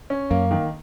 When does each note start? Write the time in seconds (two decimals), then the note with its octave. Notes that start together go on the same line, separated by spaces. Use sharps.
0.10 C#4
0.30 F#2 A#3
0.51 D#3